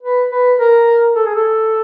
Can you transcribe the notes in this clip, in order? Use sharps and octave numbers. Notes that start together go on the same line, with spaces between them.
B4
B4
A#4
A4
G#4
A4